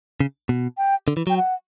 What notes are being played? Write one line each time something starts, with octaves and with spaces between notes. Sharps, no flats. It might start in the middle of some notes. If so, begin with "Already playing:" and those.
C#3
B2
G5
D3
E3
F#3 G5
F#5